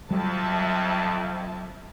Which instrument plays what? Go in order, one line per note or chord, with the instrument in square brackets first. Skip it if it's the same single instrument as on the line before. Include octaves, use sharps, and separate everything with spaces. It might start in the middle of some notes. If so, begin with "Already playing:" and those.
[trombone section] F2 [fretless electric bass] F#3 G3 [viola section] E5 A5